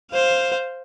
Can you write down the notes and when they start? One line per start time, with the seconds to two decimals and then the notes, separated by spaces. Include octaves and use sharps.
0.11 C5 F5